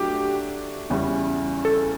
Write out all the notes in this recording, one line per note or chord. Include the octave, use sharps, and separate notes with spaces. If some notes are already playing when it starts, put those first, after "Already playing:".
Already playing: F#3 A3 D4 F#4 G4
E2 C#3 G3 C#4 E4
A4